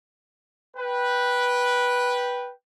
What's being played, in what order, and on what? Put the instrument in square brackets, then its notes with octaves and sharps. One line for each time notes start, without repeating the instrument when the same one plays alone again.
[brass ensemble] B4 G5